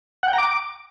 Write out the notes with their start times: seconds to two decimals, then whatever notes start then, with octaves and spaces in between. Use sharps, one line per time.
0.23 F#5
0.28 G5
0.33 A#5
0.38 D6